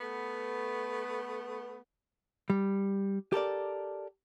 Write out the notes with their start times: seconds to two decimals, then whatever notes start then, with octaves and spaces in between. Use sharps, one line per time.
0.01 A3 B3
2.50 G3
3.32 G4 A4 A#4 D5